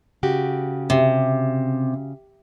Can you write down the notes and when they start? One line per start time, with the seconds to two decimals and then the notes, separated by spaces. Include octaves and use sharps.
0.23 C#3 F#4 G4
0.90 C3